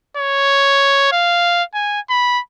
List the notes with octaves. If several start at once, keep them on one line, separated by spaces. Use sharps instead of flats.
C#5
F5
G#5
B5